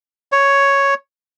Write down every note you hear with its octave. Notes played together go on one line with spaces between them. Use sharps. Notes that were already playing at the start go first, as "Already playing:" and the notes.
C#5